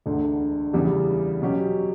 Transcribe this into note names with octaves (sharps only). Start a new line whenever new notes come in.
E1 D2 D3
E2 C#3 E3 G3 B3
B2 F#3 C#4 G4